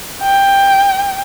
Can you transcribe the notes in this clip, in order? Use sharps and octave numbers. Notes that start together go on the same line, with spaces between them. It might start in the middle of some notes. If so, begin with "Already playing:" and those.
G5